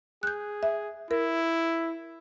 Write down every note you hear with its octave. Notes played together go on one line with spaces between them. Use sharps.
G#4 F#6 G6
E5
E4 A#4